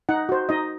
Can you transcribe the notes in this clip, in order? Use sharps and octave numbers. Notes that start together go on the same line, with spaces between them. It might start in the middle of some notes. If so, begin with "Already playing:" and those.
D#4 F#5
F#4 C5
D#4 D#5